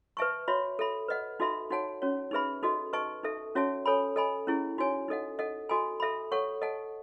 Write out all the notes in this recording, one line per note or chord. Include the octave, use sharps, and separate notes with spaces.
B4 E5 A5 C#6
F#4 C#5 E5 B5
A4 E5 B5
B4 D#5 F#5
D#4 F#4 A4 E5 B5
D#4 F#4 C#5 F#5 A5
C#4 F#4 C#5
D#4 G#4 B4 E5 B5
D#4 F#4 A4 D#5
B4 D#5 A5 C#6
D#4 A4 E5
C#4 F#4 C#5 E5 A5
A4 C#5 G#5 B5
A4 D#5 G#5 B5
C#4 E4 G#4
D#4 F#4 C#5 G#5
D#4 A4 D#5 F#5
A4 D#5 F#5
F#4 A4 D#5 G#5 B5
A4 E5 B5
A4 C#5 F#5 C#6
A4 D#5 F#5 A5